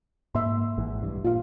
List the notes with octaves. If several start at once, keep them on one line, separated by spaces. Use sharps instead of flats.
G#2 A#3 E5 C6
G#1 G#2 E3
B1 G2
A#2 F4 F5